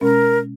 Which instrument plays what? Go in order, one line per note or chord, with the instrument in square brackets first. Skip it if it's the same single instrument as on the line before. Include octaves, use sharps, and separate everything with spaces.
[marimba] B2 G#3 C#4 [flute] A#4